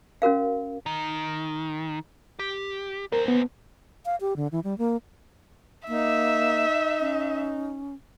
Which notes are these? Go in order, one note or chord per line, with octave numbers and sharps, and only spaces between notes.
C#4 F#4 A#4 F5
D#3
G4
D2 A#4 C5
B3
F5
G4
D3
E3
G3
A#3
A#3 D#4 E5
C#4